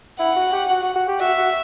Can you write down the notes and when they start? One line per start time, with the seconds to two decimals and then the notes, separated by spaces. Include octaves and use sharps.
0.19 E4 F#5
0.36 F#4
0.53 G4
0.70 F#4
0.83 F#4
0.96 F#4
1.08 G4
1.20 F#4 E5
1.38 F#4